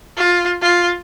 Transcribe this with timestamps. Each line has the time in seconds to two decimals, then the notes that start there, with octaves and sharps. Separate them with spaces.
0.17 F4
0.62 F4